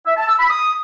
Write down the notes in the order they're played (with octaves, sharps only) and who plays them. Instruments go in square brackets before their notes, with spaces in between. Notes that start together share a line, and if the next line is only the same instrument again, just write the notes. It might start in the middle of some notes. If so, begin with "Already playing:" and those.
[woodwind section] E5
A5
E6
B5
D#6